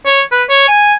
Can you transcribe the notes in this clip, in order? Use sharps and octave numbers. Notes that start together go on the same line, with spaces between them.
C#5
B4
C#5
G#5